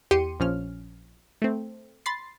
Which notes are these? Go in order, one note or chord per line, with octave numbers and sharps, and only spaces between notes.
E2 G4 C6 C#7 D#7
A#1 F3 C#4 F6
A3 C4
B5 C6 A6 C7